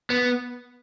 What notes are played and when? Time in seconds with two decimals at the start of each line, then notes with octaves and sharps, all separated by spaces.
0.10 B3